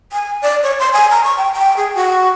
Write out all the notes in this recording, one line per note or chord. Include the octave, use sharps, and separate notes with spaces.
G#5
D5
C#5
C6
G#5
A#5
C#6
G5
G5
G#4
F#4